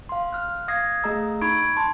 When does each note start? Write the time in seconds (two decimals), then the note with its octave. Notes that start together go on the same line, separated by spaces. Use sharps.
0.09 F5 C6
0.33 F6 F#6
0.68 F5 D#6 G#6 A#6 C7
1.03 A3 G#4 D#5 F5 A#5 E6
1.41 D#4 B5 C#6 G#6 D7
1.77 A5 C6